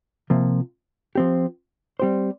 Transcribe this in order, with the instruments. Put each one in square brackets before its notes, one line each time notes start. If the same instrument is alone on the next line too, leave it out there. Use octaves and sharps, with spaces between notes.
[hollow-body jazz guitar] C3 F3 A#3
F3 C4 G4
G3 C4 G4 C5